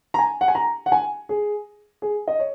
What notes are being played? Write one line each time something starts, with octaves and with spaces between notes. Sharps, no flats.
A#5
G#5
F#5
G#5
A#5
F#5
G#5
G#4
G#4
D#5
C#5